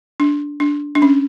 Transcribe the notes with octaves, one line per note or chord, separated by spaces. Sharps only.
D4
D4
D4
C#4